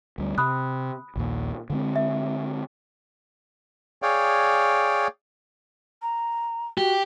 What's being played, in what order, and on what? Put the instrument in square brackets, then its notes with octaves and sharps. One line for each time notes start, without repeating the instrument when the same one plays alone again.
[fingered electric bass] D2 G3
[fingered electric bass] C3 [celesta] B5 D#6 F#6
[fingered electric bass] A#1 D#2 A#2
D3 G#3 C4
[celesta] E5
[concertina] G#4 C#5 D5 F5 G5
[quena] A#5
[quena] F#4 [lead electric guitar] G4